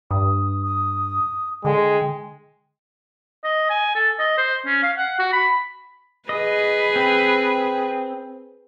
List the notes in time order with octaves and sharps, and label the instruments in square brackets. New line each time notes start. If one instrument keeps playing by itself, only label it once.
[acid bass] G2 [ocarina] D#6
[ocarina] D#6
[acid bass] D3 [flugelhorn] G#3 [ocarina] G5
[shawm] D#5
G#5
A4
D#5
C5
C#4
F5
F#5
F#4
B5
[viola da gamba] G#4 B4 [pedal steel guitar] D#5
[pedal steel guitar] C4